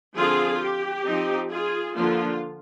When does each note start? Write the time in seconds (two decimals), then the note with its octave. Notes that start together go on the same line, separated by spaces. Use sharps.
0.16 D3 F3 C4 F4 G#4
0.61 G4
1.05 F3 C4 D#4
1.49 F4 G#4
1.94 D3 F3 A#3 D4 F4